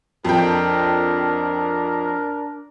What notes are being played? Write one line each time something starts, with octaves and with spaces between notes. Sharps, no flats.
F2 D4 A#4 G5